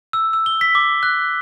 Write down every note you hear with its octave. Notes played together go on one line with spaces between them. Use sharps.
E6
E6
G7
B6
D6
F#6